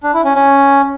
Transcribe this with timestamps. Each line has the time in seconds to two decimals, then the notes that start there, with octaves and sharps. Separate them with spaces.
0.03 D4
0.14 E4
0.25 C#4
0.35 C#4